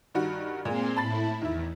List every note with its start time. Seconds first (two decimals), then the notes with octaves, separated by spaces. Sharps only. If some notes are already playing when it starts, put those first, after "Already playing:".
0.15 G2 D#3 F#4
0.65 A#2 G#3 A#3 C4 C6
0.97 A2 E4 A5 B5 A6
1.42 E2 D#3 E4